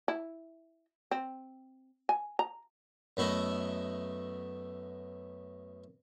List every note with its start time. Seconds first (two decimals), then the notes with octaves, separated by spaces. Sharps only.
0.08 E4
1.11 C4
2.09 G#5
2.39 A#5
3.17 F#2 A3 B3 E4 D#5